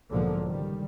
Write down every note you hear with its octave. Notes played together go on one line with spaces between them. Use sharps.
B1 G#2 D3 F3 A#3
C#2 D#3 G3